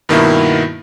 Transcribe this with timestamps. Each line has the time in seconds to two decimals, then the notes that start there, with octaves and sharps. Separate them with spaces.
0.09 G2 B2 D#3 A#3 B3 E4